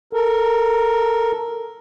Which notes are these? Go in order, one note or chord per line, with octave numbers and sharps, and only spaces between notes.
A4 A#4